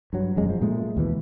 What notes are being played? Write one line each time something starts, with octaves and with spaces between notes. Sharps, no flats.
G2 F#3
E1 F#2 G#3
F3
A#2 G#3 A3
D#2 B2 E3